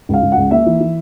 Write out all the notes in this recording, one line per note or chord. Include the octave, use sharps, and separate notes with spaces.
C#2 F5
C#2
F#5
C#2
A#3 E5
E3
E3